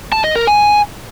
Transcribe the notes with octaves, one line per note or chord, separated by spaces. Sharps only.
A5
D#5
A#4
G#5